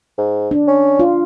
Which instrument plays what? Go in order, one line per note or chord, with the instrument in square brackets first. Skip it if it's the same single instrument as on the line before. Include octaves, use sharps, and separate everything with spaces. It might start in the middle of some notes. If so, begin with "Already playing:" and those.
[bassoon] G#2
[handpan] D4
[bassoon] C#4
[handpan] F4